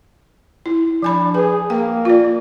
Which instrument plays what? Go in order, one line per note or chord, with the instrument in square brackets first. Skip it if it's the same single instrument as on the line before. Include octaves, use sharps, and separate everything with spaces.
[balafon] E4
[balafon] F3 G#5 B5 [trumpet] D4
[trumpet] G#4 [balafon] B4
[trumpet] A#3 [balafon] G5
[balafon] F4 D5